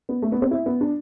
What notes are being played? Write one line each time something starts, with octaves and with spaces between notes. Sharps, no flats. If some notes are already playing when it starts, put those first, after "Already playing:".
B3
A3
B3
C4
E4
B3
D4